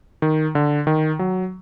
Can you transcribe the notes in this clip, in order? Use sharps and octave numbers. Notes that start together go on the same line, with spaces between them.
D#3
D3
D#3
F#3